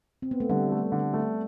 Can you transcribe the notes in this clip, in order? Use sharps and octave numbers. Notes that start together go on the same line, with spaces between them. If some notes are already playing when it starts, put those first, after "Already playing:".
C4
B3
A3
D3 G3
A3
D3
A3